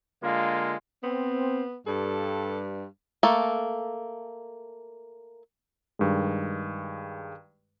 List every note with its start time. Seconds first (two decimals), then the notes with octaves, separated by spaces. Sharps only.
0.23 D3 G#3 A#3 F4
1.04 B3 C4
1.87 G2 A4
3.23 A3 A#3 A4
5.99 G2 D#3 G#3